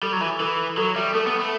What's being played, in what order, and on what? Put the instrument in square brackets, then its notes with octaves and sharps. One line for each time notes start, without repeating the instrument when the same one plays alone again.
[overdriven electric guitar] G3 [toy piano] A4
[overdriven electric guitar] F#3
[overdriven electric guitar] E3 [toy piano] E5
[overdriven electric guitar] E3 [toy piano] A4
[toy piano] B5
[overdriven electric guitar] F#3 [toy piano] A4
[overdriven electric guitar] G3 [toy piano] E5
[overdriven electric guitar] A3 [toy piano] A4
[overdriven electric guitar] B3
[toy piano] B5
[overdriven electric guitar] A3